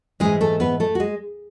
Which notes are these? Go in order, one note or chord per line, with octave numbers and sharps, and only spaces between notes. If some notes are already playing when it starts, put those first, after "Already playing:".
G#2 E3 G#3 G#4
A3 A4
B3 B4
A3 A4
F#4
G#3